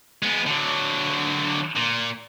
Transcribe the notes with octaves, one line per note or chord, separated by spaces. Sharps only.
G#3 B3
D3 F#3
A#2